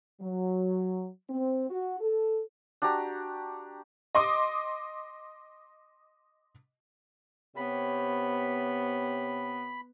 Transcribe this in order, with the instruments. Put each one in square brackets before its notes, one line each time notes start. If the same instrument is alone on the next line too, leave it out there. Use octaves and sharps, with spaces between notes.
[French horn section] F#3
C4
F#4
A4
[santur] D4 F#4 G4 A#5
[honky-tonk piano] D#5 C6 D6 D#6
[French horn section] C3 G4 C#5 [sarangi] B3 [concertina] B5